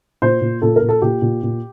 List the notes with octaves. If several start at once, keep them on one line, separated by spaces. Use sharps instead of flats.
A#2 C5
A#2
A#2 A4
A#4
A#2
A4
A#2 G4
A#2
A#2